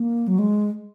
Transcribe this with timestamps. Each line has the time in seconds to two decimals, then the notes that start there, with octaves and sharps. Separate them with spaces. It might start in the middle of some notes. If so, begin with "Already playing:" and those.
Already playing: A#3
0.28 F#3
0.39 G#3